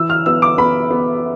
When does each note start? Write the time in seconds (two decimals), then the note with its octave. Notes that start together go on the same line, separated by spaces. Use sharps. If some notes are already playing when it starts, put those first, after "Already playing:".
Already playing: E3 E6
0.10 F6
0.26 B3 E6
0.42 D6
0.58 B3 B5
0.90 B3